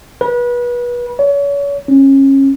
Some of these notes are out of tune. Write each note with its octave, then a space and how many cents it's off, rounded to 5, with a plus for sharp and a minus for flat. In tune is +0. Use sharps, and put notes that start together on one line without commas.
B4 -30
C#5 +35
C#4 -30